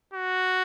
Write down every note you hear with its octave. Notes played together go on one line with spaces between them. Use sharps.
F#4